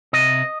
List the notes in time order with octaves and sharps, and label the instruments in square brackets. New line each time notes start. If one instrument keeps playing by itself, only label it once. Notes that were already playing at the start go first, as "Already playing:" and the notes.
[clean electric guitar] C3 D#5